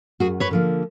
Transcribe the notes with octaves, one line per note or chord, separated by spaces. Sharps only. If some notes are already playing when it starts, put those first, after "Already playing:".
F#2 F#4 G#4
B4 C#5
D3 F3 A#3